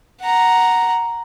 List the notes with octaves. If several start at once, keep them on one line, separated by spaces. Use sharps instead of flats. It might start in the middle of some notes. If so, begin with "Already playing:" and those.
F#5 A#5